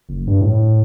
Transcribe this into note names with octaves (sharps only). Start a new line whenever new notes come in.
F#1
G2
A2